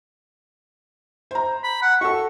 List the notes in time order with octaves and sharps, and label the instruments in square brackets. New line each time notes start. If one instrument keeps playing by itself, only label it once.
[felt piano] C5 A#5
[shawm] B5
F#5
[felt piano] F#4 A4 [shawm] C#6